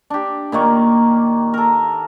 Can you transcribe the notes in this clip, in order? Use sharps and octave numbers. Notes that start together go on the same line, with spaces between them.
D4 G4
A#2 D#3 A#3 C#6
A4 A#4